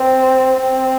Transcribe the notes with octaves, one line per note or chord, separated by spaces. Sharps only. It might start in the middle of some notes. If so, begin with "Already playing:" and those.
Already playing: C4
C4